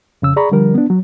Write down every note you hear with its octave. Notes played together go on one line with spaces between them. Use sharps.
F2 C#3 E6
G#4 D5 A#5 B5 C#6
D3 F3 G3 A#4
B3 D4
F#3